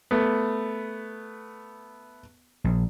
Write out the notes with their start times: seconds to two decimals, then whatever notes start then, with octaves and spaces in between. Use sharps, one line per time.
0.11 A3 B3
2.64 A#1